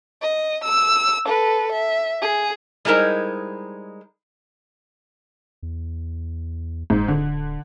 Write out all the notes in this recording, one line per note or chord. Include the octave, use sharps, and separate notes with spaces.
D#5
E6
A4 B4
E5
G#4
G3 G#3 D#4 E4 A#4 C5
E2
F#1 G#2
D1 D3